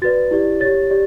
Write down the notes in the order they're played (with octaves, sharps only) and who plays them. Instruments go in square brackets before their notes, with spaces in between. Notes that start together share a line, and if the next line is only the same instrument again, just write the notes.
[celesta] F#4 B4 D5 A6
E4 G4 D5
G4 C#5 A6
G4 D5